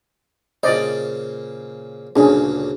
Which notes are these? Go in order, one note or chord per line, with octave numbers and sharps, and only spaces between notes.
A#2 C#3 C5 D5 D#5
D2 A#2 C#3 C#4 D4 G#4